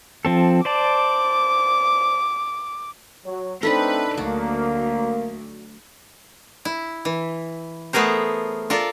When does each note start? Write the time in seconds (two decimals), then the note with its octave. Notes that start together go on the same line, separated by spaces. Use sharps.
0.25 F3 C4 A4
0.65 C5 D5 A5 D6
3.25 F#3
3.63 A3 C4 D4 D#4 A4 B4
4.17 D2 F#3 A#3 F#4 D5
6.65 E4
7.05 E3
7.93 A3 B3 G#4 A#4 C5
8.70 F4 A4 A#4 D5